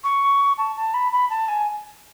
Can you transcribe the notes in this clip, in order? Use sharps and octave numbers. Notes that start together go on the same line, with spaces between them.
C#6
A5
A5
B5
B5
A5
G#5